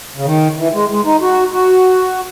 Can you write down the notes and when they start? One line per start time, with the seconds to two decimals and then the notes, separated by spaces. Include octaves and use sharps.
0.16 C#3
0.25 D#3
0.57 E3
0.74 G#3
0.90 G#3
1.05 D#4
1.22 F#4
1.54 F#4